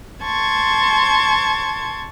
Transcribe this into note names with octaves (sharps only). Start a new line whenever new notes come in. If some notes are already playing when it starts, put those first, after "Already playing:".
A5 C6 C#6 G#6